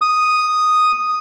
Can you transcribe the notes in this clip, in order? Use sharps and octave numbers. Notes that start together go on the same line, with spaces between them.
D#6